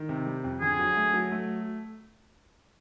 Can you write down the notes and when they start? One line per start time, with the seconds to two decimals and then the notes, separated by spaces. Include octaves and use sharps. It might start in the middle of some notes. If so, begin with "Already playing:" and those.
Already playing: D#3
0.09 C3
0.27 G3
0.44 F2
0.61 D3 G#4
0.79 F#3
0.97 A3
1.14 F#3
1.32 A3